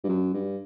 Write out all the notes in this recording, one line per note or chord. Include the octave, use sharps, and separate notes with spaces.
G2
F#2
G2